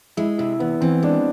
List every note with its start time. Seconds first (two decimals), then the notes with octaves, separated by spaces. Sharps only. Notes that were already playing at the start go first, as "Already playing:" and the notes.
0.17 G#3 E4
0.38 C3 E4
0.60 E2 B3
0.81 E3 C4
1.02 G#3 D4